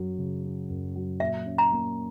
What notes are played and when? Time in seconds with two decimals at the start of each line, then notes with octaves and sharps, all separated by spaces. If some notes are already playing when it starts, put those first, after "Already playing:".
Already playing: F#2 F#3
0.18 C#3
0.43 C#4
0.69 F#2
0.95 F#3
1.20 A#2 E5
1.46 C#4
1.58 A#5
1.72 A#3